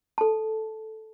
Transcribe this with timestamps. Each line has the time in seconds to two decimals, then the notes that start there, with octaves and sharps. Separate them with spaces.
0.18 A4 A5